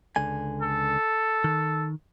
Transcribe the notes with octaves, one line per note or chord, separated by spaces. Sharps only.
C#2 D3 G#5
A4
D#3